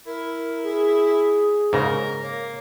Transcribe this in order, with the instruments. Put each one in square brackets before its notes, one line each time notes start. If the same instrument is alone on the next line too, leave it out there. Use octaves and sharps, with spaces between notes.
[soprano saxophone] E4 [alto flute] A#4
[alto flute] G#4
[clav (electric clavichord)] G#2 C#3 [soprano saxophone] A#4
[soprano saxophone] A#3 [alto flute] C#5